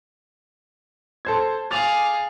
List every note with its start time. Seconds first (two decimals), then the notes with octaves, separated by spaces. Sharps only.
1.25 A4 C5 G#6
1.71 G#4 F5 D6 A6 F7